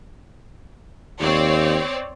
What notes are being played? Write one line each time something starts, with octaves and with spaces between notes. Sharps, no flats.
D#2 C4 C#5 D5